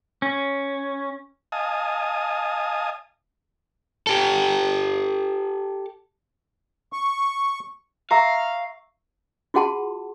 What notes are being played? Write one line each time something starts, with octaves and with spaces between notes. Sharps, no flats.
C#4
D#5 F5 G#5 A5 D#6
G4 A4
C#6
E5 F5 A#5 C#6
F4 F#4 G#4 F#5 A5 C6